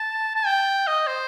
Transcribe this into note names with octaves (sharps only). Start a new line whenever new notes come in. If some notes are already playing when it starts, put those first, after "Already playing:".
Already playing: A5
A5
G5
D#5
C5